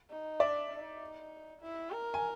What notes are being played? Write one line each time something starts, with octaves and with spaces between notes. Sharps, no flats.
D#4
D4 D5 E5
D#4
E4
A#4
G#5